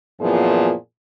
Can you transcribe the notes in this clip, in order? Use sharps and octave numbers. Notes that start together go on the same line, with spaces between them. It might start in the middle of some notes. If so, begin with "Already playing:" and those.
F#2 A#2 E3 F3 B3 G#4